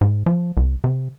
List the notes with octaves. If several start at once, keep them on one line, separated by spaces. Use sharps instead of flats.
G#2
F3
C2
C3